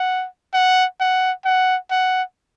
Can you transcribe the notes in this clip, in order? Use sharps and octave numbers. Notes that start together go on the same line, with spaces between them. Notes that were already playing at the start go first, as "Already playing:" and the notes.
Already playing: F#5
F#5
F#5
F#5
F#5